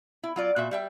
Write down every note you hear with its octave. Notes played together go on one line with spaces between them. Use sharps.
E4
F#3 F4 D5
A#2 F#4 E5
G3 E5 G5